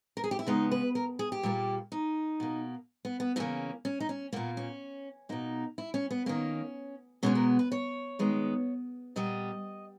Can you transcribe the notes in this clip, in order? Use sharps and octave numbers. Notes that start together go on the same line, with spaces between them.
A#4
G#4
G4
E4
C#3 G#3 B3 D#4
B4
A#4
G#4
G4
A#2 G3 A#3
D#4
B2 A#3
B3
B3
C#3 E3 G3 A#3 C#4
C#4
D#4
C#4
A#2 A#3 B3
C#4
B2 A#3 D#4
E4
C#4
B3
D#3 A#3 C#4
B2 G#3 B3 C#4
A#4
B4
C#5
D#3 G#3 B3
A#2 G3 B3 D#5